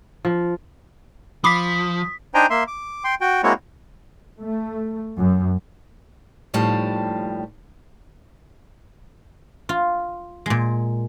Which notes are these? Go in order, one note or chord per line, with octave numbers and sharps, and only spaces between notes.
F3
F3 B5 D6 D#6 B6 C7
D4 D#4 C5 G5 G#5 A#5
A#3 E5 C6
D6
G5 C6
F#4 G5
G#3 A#3 C4 E4 F#4 C#5
A3
F#2
D#2 A2 F3 G3 A5
F4
A#2 G#3